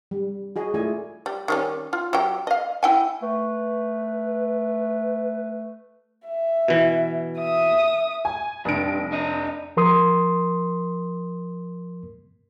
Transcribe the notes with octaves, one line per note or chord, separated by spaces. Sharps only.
G3
F#4 G#4 D#5
A3 E4 F4 G#4 D5 G#5
G3
D#3 G3 C#4
F4
F#3 G4 G5
D#5 F5
E4 G5 G#5
A3 B4
E5
B2 E3
E5 D#6
G#5
F1 G2 D4 D7
D4 D#5
F3 A#4 C6 D#6